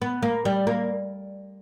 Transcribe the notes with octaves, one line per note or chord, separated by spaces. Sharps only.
B3
A#3
G3
A#3